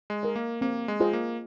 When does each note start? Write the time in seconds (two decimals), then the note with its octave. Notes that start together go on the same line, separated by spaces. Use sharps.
0.10 G#3
0.23 A#4 D#5
0.36 A#3
0.61 A#3 C4
0.88 G#3
1.00 F4 G#4 C5 D#5
1.13 A#3